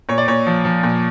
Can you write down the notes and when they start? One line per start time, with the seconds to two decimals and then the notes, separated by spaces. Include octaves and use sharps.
0.09 A#2 C#5
0.18 D5
0.28 A#2 C#5
0.47 F3
0.65 F3
0.83 A#2